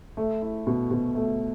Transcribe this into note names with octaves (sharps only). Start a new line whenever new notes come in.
A3
E4
B2
B2
A3